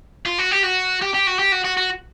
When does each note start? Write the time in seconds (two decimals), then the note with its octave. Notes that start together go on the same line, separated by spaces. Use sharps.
0.26 F4
0.39 F#4
0.52 G4
0.64 F#4
1.02 G4
1.14 G4
1.27 F#4
1.39 G4
1.52 F#4
1.65 F#4
1.77 F#4